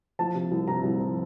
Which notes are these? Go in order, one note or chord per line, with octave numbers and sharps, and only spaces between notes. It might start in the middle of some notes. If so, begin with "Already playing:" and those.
F3 A5
C3
C2
C3 A#5
C2
F3